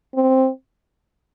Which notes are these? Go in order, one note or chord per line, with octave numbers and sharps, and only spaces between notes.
C4